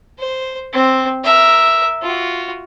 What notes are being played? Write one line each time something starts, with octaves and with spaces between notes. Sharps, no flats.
C5
C4
A#4 E5
F4 F#4